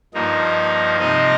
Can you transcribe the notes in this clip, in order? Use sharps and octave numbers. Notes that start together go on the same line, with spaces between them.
G2 F3 A#3 D#4
C3 F3 C4 D#4 D#5